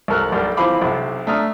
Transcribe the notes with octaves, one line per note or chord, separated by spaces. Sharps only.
C2 A4 A#4 F6 F#6
B1 G3 A#4
E3 F3 C4 F5 B5 D6
B1 C3
A3 D4 A#5 D#6 F6